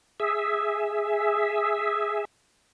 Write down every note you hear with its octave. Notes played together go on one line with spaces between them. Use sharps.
G#4 E5